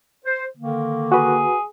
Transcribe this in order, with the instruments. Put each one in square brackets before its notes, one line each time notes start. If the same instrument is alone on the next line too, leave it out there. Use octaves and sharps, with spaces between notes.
[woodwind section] C5
D3 D#3 A#3
[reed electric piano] F#4 B4 [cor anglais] G#4